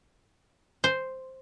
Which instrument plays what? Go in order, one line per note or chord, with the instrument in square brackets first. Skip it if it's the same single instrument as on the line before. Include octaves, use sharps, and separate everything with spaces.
[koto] C5